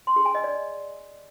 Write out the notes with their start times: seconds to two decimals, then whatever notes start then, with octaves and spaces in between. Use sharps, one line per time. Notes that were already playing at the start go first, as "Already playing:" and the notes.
0.07 C6
0.16 G#4
0.25 G#5
0.35 D#5
0.44 D5